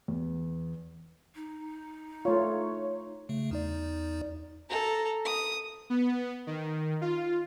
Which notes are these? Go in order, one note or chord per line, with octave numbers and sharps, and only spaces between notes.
E2
D#4
A3 F4 C#5
C#3 A3
E2 D#4 D5
A4 A#5
D#6
B3
D#3
F4